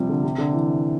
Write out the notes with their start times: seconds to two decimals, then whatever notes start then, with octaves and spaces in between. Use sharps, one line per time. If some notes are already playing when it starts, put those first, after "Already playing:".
Already playing: C3 F3 G3
0.09 D3
0.24 C3
0.38 D3
0.53 E3